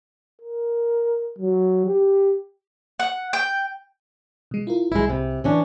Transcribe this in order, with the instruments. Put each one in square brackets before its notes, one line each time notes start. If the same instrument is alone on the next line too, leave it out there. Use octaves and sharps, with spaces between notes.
[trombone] A#4
F#3
G4
[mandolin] F#5
G5
[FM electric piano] B2 G#3
E4 F4 A#4
[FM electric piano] C2 [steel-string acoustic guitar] G#3 E4
[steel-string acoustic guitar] C3
E3 C#4 D4